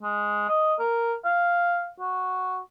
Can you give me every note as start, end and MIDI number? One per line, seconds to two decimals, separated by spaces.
0.03 0.47 56
0.49 0.74 75
0.80 1.13 70
1.25 1.88 77
2.00 2.60 66